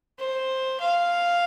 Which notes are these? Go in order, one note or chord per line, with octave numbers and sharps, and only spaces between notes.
C5
F5